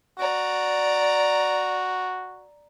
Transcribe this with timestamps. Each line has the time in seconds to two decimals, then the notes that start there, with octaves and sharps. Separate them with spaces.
0.19 F#4 D5 A#5